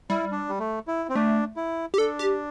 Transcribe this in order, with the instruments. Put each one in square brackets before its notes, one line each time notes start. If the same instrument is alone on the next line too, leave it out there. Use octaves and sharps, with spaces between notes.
[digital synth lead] G3 [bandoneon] E4
[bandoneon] D4
G3
A3
E4
C4
[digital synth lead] A3 [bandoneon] D4
[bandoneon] E4
[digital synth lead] G4
[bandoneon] D4 [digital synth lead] A4
[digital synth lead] G4